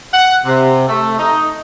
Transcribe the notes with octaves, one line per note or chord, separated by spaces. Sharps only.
F#5
C3
A3
D#4